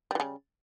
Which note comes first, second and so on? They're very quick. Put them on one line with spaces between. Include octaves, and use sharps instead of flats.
G3 E3 C#3